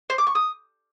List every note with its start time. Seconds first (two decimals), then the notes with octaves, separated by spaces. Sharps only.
0.10 C5
0.18 D6
0.27 C#6
0.35 D#6